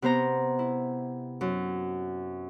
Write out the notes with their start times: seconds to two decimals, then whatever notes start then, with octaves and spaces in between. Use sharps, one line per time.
0.02 C3 B3 C5 A#5
0.59 E4
1.41 F#2